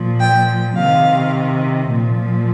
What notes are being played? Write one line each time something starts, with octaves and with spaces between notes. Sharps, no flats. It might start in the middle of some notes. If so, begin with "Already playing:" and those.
Already playing: A#2 F3
G5
C3 D#3 F5
A#2 F3